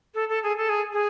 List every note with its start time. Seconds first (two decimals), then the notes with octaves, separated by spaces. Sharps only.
0.14 A4
0.29 A4
0.42 G#4
0.57 A4
0.69 G#4
0.92 G#4